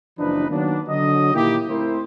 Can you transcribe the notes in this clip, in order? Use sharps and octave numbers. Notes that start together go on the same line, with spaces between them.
F#1 E3 F3 D4 D#4 B4
D#3 F#3 A#3 B3 D4
D3 F#3 D#5
A#2 D#3 A#3 E4 G4
A3 C4 E4 A#4 C5